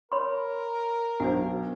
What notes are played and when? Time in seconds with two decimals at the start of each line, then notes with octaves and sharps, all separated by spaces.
0.12 A#4 C#5 B5 C6
1.20 B1 D4 F#4 C5